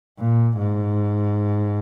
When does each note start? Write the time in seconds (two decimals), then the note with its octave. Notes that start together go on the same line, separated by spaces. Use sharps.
0.18 A#2
0.58 G#2